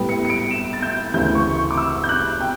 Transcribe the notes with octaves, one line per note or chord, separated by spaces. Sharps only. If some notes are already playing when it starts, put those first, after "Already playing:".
Already playing: A2 G3 B3
C#7
C#7
D7
E7
A6
G6
D2 C#3 E3 G6
C#6
C#6
D6
E6
G6
F#6
G5